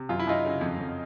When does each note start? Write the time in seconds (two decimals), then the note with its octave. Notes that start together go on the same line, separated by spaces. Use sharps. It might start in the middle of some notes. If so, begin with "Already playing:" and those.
Already playing: C3
0.09 F#2 F4
0.19 E4
0.27 F#2 D#4 F4
0.45 C#3
0.61 F2
0.78 F2